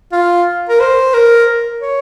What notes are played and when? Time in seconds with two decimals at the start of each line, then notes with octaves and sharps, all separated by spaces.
0.12 F4
0.69 A#4
0.80 C5
1.14 A#4
1.81 C#5